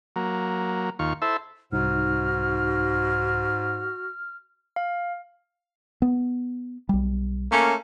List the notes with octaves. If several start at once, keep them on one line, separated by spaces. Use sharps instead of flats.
F#3 A#3
D#2 F4 C#6
E4 A4 C5 E5
C2 G#2 D#4 F#4 F6
F5
B3
B1 G3
A3 A#3 C#4